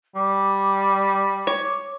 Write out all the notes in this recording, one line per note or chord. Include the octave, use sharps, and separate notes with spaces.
G3 D6
C#5